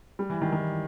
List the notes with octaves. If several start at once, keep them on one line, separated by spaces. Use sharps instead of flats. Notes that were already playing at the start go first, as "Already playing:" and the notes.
G3
E3
D#3
D#3